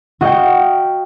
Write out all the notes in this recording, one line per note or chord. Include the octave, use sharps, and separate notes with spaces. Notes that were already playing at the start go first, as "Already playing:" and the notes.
F#4 D#5 F5 G5